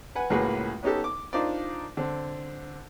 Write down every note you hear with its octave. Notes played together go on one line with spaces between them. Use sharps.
B4 F#5 G#5
C#2 A2 A#3 F#4 G#4 B4
B3 C#4 D#4 G4 A4
D6
D4 D#4 F4 A#4 C5 D5
D3 C4